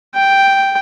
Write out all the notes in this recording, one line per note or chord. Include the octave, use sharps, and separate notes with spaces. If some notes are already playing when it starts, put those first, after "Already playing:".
G5